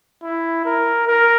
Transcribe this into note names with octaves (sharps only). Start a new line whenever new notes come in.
E4
A#4
A#4